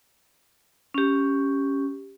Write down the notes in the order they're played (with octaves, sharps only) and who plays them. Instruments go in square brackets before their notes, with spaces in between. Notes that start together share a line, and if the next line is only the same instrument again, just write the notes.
[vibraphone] C#4 G4